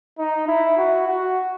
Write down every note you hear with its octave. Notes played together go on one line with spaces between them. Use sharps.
D#4
E4
F#4
F#4